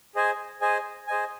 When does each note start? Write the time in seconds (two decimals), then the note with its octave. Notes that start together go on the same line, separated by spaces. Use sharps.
0.15 G#4 C5 D#5 G#5
0.61 G#4 C5 D#5 G#5
1.07 G#4 C5 D#5 G#5